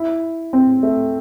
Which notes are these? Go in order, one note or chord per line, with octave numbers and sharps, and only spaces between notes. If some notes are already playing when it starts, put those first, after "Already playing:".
Already playing: E4
C4
A3